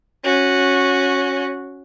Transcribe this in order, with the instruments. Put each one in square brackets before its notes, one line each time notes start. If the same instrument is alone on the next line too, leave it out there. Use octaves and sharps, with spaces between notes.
[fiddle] C#4 F#4